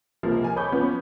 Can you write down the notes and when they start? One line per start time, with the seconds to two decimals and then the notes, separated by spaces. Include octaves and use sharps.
0.23 C#2 C3 F3 A#3
0.43 A#4 G#5
0.56 C#5 B5 C#6 D6 G6
0.72 F3 B3 C#4